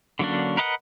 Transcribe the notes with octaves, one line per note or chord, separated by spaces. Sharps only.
D3 F#3 A#3 C#4 D4
A#4 B4 D#5 F5 F#5